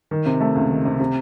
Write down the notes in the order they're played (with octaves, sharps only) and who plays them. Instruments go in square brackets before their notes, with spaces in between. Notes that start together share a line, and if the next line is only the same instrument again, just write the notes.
[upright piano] D#3
C3
A3
C#2
D#3
C3
C3